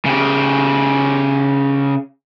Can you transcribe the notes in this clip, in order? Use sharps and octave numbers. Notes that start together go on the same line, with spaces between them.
C#3 G4